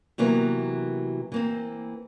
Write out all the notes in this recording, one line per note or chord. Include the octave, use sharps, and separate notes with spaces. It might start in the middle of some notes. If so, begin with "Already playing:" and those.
C3 E3 F#3 A#3 B3
E3 A#3 C4